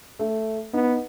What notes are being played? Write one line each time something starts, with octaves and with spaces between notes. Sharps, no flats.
A3
B3 D#4